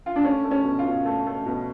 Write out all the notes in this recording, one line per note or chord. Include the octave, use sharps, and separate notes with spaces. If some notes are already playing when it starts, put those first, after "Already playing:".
F4
D4
A3 C#4
A3
C#4
B2
F4
B2
A3
A3
B2